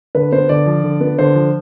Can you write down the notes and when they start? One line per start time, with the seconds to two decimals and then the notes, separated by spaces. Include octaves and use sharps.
0.15 D3 B4
0.32 B3 C5
0.49 D3 D5
0.66 F3
0.84 D3
1.01 B3
1.18 D3 C5
1.35 F3